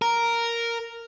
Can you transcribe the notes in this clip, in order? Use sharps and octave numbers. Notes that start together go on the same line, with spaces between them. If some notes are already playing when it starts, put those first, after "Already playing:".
A#4